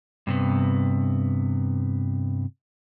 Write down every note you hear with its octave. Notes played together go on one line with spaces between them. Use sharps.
G2 C3 B3